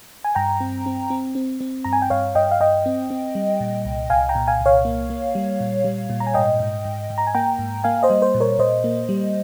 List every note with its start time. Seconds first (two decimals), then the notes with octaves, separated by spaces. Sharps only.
0.24 G#5
0.35 G2 G5 A#5
0.60 C4
0.86 C4
1.10 C4
1.35 C4
1.61 C4
1.84 G2 A#5
1.93 G#5
2.02 G5
2.10 G2 C#5 F5
2.35 G2 D#5 G5
2.51 F5
2.60 G2 D#5 G5
2.86 C4
3.10 C4
3.35 G3
3.60 A#2
3.85 C2
4.10 C2 F5 G#5
4.29 G5 A#5
4.35 A#2
4.47 F5 G#5
4.60 C2
4.66 C#5 F5
4.85 A#3
5.10 A#3
5.35 G3
5.60 A#2
5.84 G3
6.10 A#2
6.20 A#5
6.27 G#5
6.34 G#2 D#5 G5
6.60 G#2
6.85 G#2
7.10 G#2
7.18 A#5
7.27 G#5
7.35 A#3 G5 A#5
7.59 G#2
7.84 A#3 F5 G#5
8.03 C5 D#5
8.10 G3
8.22 C5
8.34 A#2
8.40 A#4 C#5
8.59 A#2 C5 D#5
8.84 A#3
9.09 G3